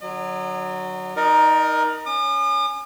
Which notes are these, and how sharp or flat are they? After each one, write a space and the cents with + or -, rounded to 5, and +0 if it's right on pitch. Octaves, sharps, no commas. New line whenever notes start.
D3 +35 F#3 +0 D#5 -40
D#4 +10 A#4 +15 D5 +45
C#4 +0 D#6 -45